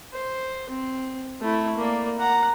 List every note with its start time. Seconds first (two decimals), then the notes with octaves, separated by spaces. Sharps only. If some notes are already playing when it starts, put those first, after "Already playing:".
0.13 C5
0.70 C4
1.41 A3 E4
1.77 A#3 D5
2.18 F#5 A#5